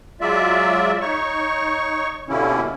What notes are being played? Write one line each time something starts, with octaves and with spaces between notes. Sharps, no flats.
F#3 G#3 F4 D5 E5
D#4 C#5 C#6
B2 D3 G3 A#3 C#4 E4